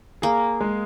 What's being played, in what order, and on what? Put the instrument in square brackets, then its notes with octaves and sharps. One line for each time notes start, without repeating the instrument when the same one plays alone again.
[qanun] A#3 [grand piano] G#4
[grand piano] G#3